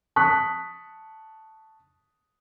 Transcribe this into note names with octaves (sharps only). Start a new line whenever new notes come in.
A5 C#6 D#6 F#6 B6